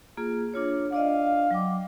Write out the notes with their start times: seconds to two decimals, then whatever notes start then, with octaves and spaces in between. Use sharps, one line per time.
0.17 A#3 F4 G#4
0.54 D4 F4 C#5
0.92 D4 D5 D#5 F5
1.51 F#3 G5 D6